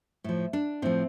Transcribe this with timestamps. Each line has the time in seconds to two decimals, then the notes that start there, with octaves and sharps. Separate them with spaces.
0.24 A2 F3
0.53 D4
0.82 A2 F3 C4